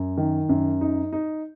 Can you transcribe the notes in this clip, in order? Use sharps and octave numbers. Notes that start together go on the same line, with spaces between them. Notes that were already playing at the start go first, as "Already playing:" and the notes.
Already playing: F#2
D#3
F#2
D#4
D#4